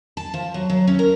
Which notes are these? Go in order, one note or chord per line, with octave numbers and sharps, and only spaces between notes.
A5
F3
F#3
F#3
C#4
A#4